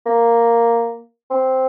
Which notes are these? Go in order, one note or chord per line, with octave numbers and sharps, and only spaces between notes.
A#3
C4